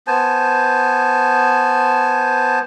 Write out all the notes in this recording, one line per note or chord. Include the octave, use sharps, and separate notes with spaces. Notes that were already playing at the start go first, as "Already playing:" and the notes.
B3 C5 G#5 A5